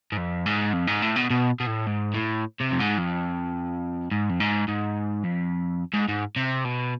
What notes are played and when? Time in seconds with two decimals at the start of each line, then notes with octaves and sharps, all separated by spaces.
0.12 G#2
0.18 F2
0.46 G#2
0.73 F2
0.87 G#2
1.02 A2
1.16 B2
1.30 B2
1.60 B2
1.67 A2
1.87 G#2
2.14 A2
2.61 C3
2.72 F2
2.80 G#2
2.99 F2
4.11 G#2
4.30 F2
4.40 G#2
4.68 G#2
5.24 F2
5.94 G#2
6.09 G#2
6.36 C3
6.65 B2